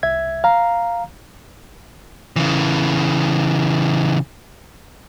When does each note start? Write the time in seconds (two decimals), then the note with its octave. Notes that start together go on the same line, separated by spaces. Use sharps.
0.03 C2 E5 G#6
0.44 F5 A#5
2.36 C#3 E3